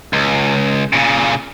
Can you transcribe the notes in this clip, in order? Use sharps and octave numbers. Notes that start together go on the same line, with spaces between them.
C#2
A#2 C#3